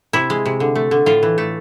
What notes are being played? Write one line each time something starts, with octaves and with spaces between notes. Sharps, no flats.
C3 E4
G#3
C3
D3
A3
D3
A2 F4
E3
A3